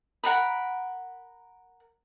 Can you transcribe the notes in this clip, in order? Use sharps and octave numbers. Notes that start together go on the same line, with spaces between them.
A#4 F#5 A#5 B5